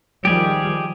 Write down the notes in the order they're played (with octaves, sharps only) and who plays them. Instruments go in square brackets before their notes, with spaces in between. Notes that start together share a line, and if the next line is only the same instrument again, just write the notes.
[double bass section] D#3 F3 G3 [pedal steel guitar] G4 G#4